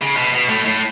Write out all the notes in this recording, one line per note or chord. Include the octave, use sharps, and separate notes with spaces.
C#3
B2
B2
A2
A2